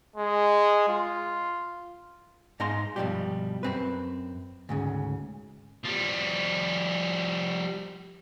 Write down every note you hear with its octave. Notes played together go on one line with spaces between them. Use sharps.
G#3
F4
G#2 D#4 F5 A#5 C6
G2 B2 D3 F3 G3 G4
F#2 C4 B4
D2 G#2 C#3
F3 G3